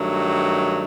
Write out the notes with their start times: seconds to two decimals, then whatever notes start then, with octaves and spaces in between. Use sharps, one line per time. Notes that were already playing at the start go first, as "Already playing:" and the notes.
Already playing: G2 D#3 F#3 A3